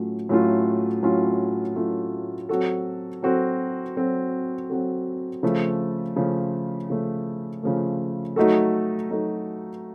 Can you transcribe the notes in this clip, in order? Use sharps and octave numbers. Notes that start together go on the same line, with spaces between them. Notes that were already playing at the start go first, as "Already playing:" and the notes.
Already playing: A2 F#3 A3 C#4 F4
A2 F#3 A3 C#4 F4
A2 F#3 A3 C#4 F4
A2 F#3 A3 C#4 F4
F#3 C4 F#4 A4
F#3 C4 F#4 A4
F#3 C4 F#4 A4
F#3 C4 F#4 A4
C#3 F3 A3
C#3 F3 A3
C#3 F3 A3
C#3 F3 A3
F#3 A3 D#4 F#4 A4
F#3 A3 D#4 F#4 A4